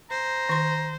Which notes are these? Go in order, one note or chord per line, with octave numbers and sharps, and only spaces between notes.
C5 A#5
D#3 C6